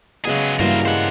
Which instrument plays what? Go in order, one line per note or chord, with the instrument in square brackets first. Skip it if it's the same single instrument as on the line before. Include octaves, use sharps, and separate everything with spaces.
[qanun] C#3 G#3 B3 [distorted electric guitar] F#3 G#4
[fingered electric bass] G2 G3 [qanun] E3 F#3 A#3 [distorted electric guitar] A#4 C5
[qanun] G#3 [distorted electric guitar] C5 F#5